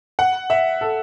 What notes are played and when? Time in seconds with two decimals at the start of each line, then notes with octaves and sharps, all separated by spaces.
0.19 F#5
0.50 E5
0.81 A4